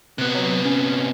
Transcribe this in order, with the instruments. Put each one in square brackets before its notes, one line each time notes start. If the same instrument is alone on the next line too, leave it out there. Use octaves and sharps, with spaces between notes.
[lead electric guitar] C3 B3 [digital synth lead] F#6
[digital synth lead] F#3
C#4